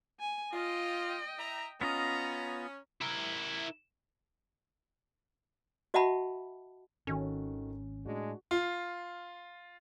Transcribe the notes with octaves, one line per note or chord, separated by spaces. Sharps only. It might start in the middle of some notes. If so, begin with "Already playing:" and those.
G#5
F4 D#5 G5
E4 E5 A#5
B3 C#4 F4 D#5 A#5
E4 A#4
F#4 D#5 E5 F#5 A5 B5
G#1 D#3 C#4 F#4 A4
A2 G#3 D4 F#4
F4